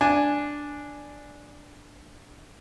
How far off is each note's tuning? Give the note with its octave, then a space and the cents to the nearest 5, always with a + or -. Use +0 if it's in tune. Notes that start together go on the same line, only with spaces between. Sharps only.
D4 +0 G#5 +0